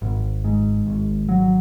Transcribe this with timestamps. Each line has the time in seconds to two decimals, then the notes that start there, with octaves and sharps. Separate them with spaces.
0.02 G#1
0.44 G#2
0.87 G#1
1.29 F#3